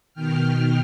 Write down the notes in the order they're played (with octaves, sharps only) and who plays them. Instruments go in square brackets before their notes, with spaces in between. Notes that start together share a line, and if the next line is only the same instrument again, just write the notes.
[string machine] B2 D#3 G5 F6